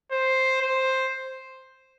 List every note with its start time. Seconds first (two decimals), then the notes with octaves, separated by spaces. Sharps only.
0.11 C5
0.62 C5